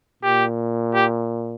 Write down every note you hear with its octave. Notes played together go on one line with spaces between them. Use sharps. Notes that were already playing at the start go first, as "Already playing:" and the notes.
A#2 G4
G4